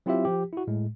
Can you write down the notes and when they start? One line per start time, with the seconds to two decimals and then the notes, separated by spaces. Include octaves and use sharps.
0.06 F#3 C4 E4 F4 G4 E5
0.25 F3 G4
0.53 E4 F#4
0.67 A2 G#3